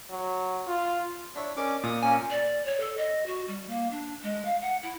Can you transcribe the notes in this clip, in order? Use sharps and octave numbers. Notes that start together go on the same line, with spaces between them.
F#3
F4
D4 E4 C#5
C#4 D#4 A#4 D5 D6
A#2 D#6
A#3 C#4 G#5
D5
C#5
A4
D#5
F#4
G3
A#3
D4
G#3
F5
F#5
E4